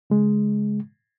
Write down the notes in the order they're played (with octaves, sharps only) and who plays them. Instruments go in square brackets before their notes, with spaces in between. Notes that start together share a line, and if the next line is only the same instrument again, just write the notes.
[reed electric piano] C#3 G#3